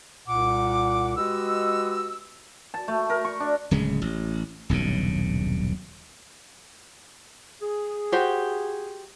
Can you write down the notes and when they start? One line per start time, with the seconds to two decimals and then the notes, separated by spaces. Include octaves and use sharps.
0.28 C2 A#2 F#5 D6
1.17 G#3 F#4 G4 B4 D#5 E6
2.74 A5
2.88 A3
3.10 A#4
3.25 C#6
3.40 D4
3.71 D1 C#3 G#3
4.02 A1
4.69 D#1 B1 G2 C#3
7.61 G#4
8.12 F#4 G4 C5